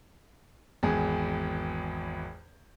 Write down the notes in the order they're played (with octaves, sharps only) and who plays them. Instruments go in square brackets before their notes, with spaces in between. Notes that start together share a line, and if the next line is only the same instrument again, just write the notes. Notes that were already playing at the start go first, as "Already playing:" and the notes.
[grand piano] G#1 E2 G#4